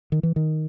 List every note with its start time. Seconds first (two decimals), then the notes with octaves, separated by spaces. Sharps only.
0.12 D#3
0.23 E3
0.36 D#3